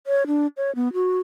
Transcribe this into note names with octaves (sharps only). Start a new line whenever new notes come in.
C#5
D4
C#5
B3
F#4